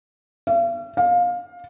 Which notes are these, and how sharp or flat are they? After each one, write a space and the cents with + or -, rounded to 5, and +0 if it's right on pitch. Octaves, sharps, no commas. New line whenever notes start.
F5 -45
F5 +20